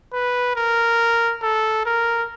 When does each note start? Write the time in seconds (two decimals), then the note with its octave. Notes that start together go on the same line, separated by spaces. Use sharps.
0.13 B4
0.56 A#4
1.42 A4
1.85 A#4